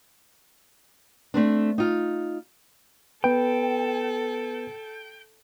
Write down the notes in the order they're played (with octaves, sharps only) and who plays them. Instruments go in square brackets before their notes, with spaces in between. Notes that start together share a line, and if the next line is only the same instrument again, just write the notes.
[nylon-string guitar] A3 C4 D4
D#4 F4
[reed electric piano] B3 B4 [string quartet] A4 [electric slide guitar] G5